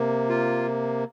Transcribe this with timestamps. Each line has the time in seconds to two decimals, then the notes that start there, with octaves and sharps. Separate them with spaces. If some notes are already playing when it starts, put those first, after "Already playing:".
Already playing: C3 A#3
0.29 F4